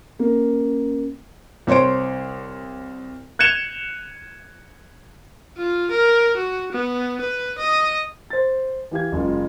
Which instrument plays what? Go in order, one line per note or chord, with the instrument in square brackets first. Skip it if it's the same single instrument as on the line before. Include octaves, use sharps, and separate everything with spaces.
[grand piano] A#3 [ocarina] C#4
[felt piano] C2 C5 C#5 C6 D7
[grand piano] F#6 G#6 C#7 E7 F7 G7
[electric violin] F4
A#4
F#4
B3
B4
D#5
[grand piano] C5 A6
E3 G4 F5 G#6
F#1 G#3 F4